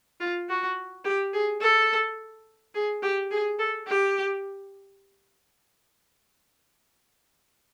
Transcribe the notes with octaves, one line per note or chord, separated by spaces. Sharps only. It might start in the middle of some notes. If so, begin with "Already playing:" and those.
F4
F#4
G4
G#4
A4
G#4
G4
G#4
A4
G4